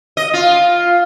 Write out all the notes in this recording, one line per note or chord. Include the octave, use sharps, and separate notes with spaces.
D#5
F4